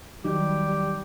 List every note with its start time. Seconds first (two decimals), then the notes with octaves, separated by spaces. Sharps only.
0.25 D#3 F#3 G3 D#4 G4